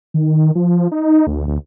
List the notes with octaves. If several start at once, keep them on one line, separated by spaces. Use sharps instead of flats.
D#3
F3
D#4
D2
D2